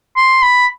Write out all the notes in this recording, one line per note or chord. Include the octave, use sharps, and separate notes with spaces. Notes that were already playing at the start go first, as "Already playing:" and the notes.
C6
B5